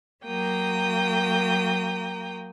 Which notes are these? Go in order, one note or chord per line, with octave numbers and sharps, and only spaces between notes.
F#3 A#3 G5 A#5 D#6